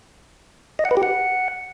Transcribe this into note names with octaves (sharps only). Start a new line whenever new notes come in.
D#5
F#5
B4
G4
F#5